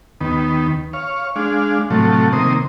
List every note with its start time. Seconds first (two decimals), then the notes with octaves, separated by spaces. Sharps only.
0.21 D#2 D#3 B3
0.93 C#5 F5
1.36 G#3 D4 F5
1.91 A2 C3 F3 F#3 A3
2.33 C3 D#3 A#3 C5 D#6